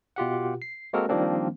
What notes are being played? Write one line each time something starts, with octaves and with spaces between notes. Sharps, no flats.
B2 F4 G4 F#5
C7
G#3 A#3 C4 F#4 A4 A#4
D#3 F3 G3 A#3 C4 D4